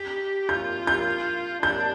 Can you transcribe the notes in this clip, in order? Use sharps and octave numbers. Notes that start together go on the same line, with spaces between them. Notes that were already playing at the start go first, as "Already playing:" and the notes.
Already playing: G4
F4 G6
G6
D4 G6